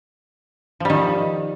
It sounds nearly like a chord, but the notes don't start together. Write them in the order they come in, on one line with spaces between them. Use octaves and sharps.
F3 G3 D#3